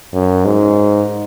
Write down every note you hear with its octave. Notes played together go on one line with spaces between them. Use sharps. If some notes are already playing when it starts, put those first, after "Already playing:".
F#2
G#2